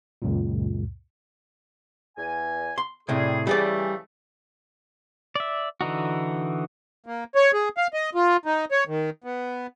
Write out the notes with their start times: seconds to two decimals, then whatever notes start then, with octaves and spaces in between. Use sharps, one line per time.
0.22 C#2 F#2 A#2
2.18 E2 G#5
2.78 C6
3.09 A2 C3 G3 G#4
3.47 C#3 E3 G3 A3 G#4 D5
5.36 D5 E5
5.81 D3 E3 D#4 F#4
7.06 A#3
7.35 C#5
7.53 G#4
7.77 F5
7.94 D#5
8.15 F4
8.45 D#4
8.71 C#5
8.88 D#3
9.24 B3